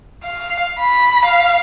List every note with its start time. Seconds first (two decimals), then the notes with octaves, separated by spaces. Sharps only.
0.24 F5
0.79 B5
1.25 F5